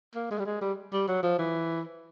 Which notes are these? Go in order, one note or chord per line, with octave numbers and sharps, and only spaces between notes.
A#3
G#3
G3
G#3
G3
G3
F#3
F3
E3